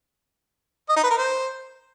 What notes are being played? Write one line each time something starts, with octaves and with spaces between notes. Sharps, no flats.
D#5
D#4
B4
A#4
C5